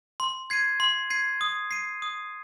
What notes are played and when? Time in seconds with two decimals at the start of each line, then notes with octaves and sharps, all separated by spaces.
0.20 C6
0.50 G#6 C7 D#7
0.80 C6
1.10 G#6 C7 D#7
1.41 D#6
1.71 C7 D#7
2.02 D#6